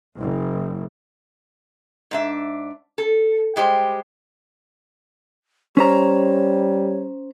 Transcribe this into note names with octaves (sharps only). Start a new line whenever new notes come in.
F#1
G#2 D4 E5
A4
G3 G#3 G4 C5
G3 C#4 C5 C#5 A#5